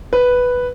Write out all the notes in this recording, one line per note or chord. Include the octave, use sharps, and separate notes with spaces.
B4